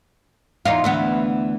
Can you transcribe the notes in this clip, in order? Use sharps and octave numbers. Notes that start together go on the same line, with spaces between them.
E2 D#4 F4
D2 E3 B3